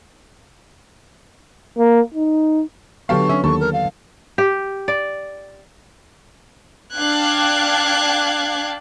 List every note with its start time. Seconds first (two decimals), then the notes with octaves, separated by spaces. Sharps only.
1.78 A#3
2.14 D#4
3.09 D3 F#3 B3 G4 A4 F5 C#6
3.29 C#4 E5
3.44 D#2 A4 C#6
3.60 A#4
3.73 F5
4.38 G4
4.88 D5
6.94 D4 F5 G5 F#6 G#6